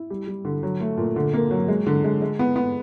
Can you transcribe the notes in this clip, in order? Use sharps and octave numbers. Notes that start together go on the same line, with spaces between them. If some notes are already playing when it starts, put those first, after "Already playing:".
Already playing: E4
G3
G3
D3
F#3
A3
A#2
D3
A#3
F#3
G#3
D3
G#3
G#3
B3
B3